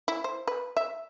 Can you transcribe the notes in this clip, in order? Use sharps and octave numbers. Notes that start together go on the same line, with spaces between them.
E4
C5
B4
E5